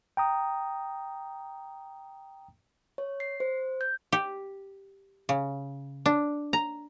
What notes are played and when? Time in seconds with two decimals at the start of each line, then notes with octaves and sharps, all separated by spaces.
0.17 G5 A#5 D#6
2.98 C#5
3.20 C7
3.40 C5
3.81 G6
4.12 G4
5.29 C#3
6.06 D4
6.53 A#5